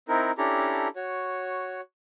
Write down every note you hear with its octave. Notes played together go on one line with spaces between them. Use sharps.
C4 D#4 E4 A#4
C#4 D4 E4 G4 A4 A#5
F#4 C#5